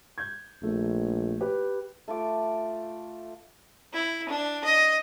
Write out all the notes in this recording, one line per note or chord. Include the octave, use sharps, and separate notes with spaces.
G6 G#6
A#1 A3
G4 B4
A3 F4 D6
E4
D4
D#5